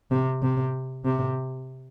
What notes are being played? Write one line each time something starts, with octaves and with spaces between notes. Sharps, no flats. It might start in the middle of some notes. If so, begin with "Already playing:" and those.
C3
C3
C3